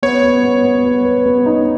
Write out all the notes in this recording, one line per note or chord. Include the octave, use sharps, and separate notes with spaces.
B3 C#5
B3
B3
B3
B3
B4
B3
D#4